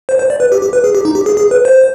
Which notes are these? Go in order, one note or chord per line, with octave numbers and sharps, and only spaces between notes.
C5
C5
D5
B4
G4
G4
B4
G#4
G4
D#4
G4
G#4
G#4
B4
C5